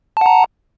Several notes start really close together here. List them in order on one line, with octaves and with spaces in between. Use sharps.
A5 F#5 A#5